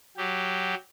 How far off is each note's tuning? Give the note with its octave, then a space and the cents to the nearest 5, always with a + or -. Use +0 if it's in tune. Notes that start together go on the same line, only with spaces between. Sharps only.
F#3 +0 G4 +0